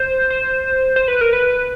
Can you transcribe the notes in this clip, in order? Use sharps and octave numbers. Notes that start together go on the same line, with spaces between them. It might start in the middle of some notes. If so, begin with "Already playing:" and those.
Already playing: C5
C5
C5
B4
A#4
B4